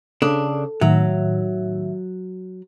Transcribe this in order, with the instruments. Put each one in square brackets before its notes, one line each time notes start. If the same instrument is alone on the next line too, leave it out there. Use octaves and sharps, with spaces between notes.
[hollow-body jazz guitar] C#3 D4 [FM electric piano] A4
[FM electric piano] A2 D#3 E5 [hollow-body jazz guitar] F#3